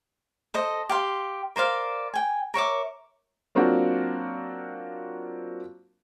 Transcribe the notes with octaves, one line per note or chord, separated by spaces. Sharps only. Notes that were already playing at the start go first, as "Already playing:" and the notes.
A4 C5 D#5
G4 F5 C6
A#4 C5 D5 F5
G5 G#5
A#4 C#5 E5 D6
F#3 A#3 C4 D4 F4 F#4